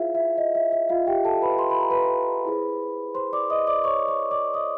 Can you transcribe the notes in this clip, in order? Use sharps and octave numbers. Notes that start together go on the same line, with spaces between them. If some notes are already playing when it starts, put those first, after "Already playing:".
Already playing: E4 F4 G#4 C5 E5 F5
E5
D#5
E5
E5
F4 F5
G4 G5
A4 A5
B4 B5
C6
B5
A#5
B4 B5
E4 G#4 C5
C5 C6
D5 D6
D#5 D#6
D5 D6
C#5 C#6
C#5 C#6
D5 D6
D#5 D#6